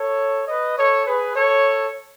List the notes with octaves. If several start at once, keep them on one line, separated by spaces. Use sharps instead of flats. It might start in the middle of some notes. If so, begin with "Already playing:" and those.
Already playing: A4 C#5
B4 D#5
A4 C#5
G#4 B4
A4 C#5